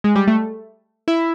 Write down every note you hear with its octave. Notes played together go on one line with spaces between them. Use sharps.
G#3
G3
A3
E4